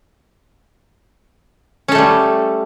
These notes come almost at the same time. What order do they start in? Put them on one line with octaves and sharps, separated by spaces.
C#4 A4 A3 G3